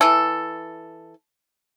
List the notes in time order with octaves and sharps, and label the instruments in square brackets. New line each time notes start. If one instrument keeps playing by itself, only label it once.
[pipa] E3 A4